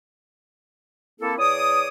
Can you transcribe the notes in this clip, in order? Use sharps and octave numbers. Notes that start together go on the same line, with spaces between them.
A#3 C4 E4 A4
E2 C#5 D5 D6 D#6